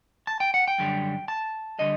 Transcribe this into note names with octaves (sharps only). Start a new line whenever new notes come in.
A5
G5
F#5
G5
F#2 D3 G3
A5
D3 G3 D#5